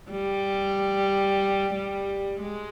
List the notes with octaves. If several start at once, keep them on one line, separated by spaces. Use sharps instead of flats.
G3
G3
G#3